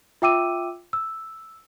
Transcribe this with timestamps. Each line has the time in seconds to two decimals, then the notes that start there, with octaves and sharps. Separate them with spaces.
0.22 F4 E5 G5 D6 E6 D#7
0.93 E6